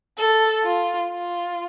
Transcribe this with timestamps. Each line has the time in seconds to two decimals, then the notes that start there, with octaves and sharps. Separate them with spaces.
0.18 A4
0.64 F4
1.11 F4